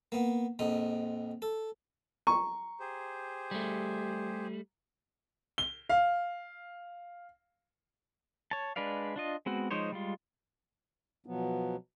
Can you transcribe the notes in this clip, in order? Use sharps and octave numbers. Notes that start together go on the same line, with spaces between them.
A#3 B3
A#1 F2 D#4
A4
A#5 C#6
G4 G#4 C5
G3 A3
G7
F5
C#5 A5
G#3 D4 B4 D5 F5
D4 F4 D#5
G#3 B3 C4 F#4
F3 G#3 D#4 C5 C#5
G3 G#3 F4
B2 F3 F#3 B3